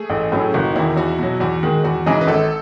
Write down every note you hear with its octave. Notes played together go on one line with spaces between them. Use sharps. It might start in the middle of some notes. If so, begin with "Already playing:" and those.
Already playing: A3 G#4
A1 A4
A2 F#3 C#4 G#4
F#1 F#4
D#4
E2 D#3 E4
E2 F#4
B2 F#3
E2 F#4
D#3 G#3
E2 F#4
C#3 E3 G#3 D#4 G#4
B4
G#1 A4